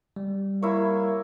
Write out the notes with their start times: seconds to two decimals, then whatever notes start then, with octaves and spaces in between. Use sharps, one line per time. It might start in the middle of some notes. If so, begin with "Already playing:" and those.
0.16 G3
0.62 A#3 E4 C#5